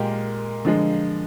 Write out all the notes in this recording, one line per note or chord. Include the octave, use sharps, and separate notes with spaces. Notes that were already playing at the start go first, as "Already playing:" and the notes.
Already playing: A#2 G#3 G4 A#4
D3 F3 G#3